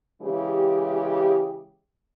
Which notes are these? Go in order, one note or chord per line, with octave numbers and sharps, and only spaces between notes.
C#3 E3 G#3 G4